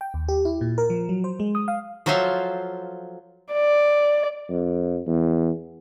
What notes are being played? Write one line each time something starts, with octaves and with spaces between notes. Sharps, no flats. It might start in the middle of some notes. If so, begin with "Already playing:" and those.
G5
D#2
G4
E4
A#2
A#4
F3
F#3
C5
G#3
D#6
F5
F3 F#3 A4 C5 E5 F5
D5
F2
E2